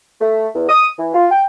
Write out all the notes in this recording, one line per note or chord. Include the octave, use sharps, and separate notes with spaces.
A3
E2
D#6
E3
F4
G5